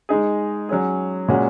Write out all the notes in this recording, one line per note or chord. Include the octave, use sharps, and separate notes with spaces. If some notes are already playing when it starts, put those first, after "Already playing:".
G#3 D#4 G#4
F#3 C#4 G#4
A#2 G#3 C#4 F#4